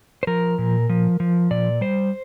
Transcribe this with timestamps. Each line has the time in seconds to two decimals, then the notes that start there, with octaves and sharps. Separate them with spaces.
0.23 C5
0.27 F3 A#4
0.58 A#2
0.89 F3
1.20 F3
1.51 A#2 D5
1.81 G3 C5